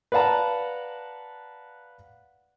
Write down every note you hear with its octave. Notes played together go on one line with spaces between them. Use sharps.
B4 D5 F5 F#5 A5 A#5